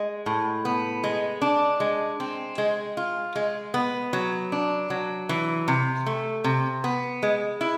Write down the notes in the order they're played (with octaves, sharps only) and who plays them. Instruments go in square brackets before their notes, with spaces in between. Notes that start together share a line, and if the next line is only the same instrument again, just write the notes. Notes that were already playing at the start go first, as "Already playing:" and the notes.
Already playing: [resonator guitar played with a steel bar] G#3
A2
B3
G#3
D4
G#3
C4
G#3
F4
G#3
B3
F#3
D4
F#3
E3
C3
A3
C3
B3
G#3
E4